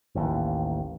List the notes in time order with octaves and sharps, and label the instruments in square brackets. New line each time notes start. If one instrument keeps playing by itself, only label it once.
[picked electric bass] A1 D#2